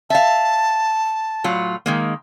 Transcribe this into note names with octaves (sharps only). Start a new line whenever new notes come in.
E5 F5 A5
A2 F#3 F4
D#3 G#3 A#3